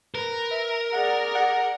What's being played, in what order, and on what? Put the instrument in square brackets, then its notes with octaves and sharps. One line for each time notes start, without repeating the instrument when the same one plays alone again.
[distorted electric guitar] A#4 [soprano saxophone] B4
[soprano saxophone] E5
[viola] G#4 D5 [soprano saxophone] F#5
[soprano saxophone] F#5